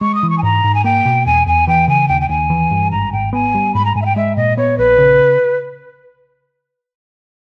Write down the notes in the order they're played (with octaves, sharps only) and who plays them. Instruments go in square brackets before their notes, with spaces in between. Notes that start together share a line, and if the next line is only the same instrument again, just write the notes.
[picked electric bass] G#3 [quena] C#6
[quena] D#6
[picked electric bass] E3
[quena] C#6
G#5
[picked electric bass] G#2 [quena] A#5
[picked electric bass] G#2
[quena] G#5
[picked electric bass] A#3 [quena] G5
[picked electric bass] B2
[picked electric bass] E2 [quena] G#5
[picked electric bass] E2 [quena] G#5
[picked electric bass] E3 [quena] G5
[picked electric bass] C#3 [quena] G#5
[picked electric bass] D#2 [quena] G5
[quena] G5
[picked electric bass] D#2 [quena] G#5
[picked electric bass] E3
G2
[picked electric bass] G#1 [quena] A#5
[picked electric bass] G#1 [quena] G5
[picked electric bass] B3 [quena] G#5
[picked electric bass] G3
[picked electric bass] G#2 [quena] B5
[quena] A#5
[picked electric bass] G#2 [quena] G#5
[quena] E5
G5
[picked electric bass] G#3 [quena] E5
[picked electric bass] A#2 [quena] D#5
[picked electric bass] B3 [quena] C#5
[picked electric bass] A#1 [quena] B4
[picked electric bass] C#3